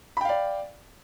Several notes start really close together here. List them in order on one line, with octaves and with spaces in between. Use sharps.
B5 G5 F5 D5